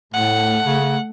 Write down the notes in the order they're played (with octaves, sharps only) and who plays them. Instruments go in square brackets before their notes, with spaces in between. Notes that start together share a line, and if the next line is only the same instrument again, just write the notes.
[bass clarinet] A2 [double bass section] A3 [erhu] F#5
[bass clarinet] C#3